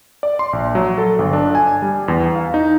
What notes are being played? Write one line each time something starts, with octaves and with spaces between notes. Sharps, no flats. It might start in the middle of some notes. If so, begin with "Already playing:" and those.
D5
C6
A#1
F#3
A4
G1
D4
G#5
G3
E2
F5
D#4